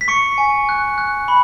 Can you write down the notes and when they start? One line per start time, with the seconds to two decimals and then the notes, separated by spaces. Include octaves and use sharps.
0.01 B6
0.08 C#6 C#7
0.38 G#5
0.69 F#6
0.98 F#6
1.28 B5